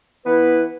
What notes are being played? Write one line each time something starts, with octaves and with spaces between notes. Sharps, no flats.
E3 B3 E4 B4